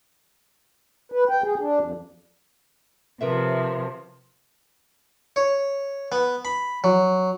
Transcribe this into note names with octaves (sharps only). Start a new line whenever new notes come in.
B4
G5
G#4
D4
F2
C3 F3 A#4 B4 E5
C#5
B3
B5
F#3